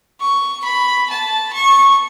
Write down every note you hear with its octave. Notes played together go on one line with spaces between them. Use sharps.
C#6
B5
A5
C#6